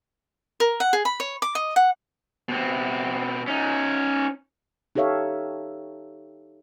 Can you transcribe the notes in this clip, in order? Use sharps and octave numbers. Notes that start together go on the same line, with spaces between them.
A#4
F#5
G#4
B5
C#5
D6
D#5
F#5
B2 C4
C#4 D#4
D#4 G4 A4 C#5 E5 F5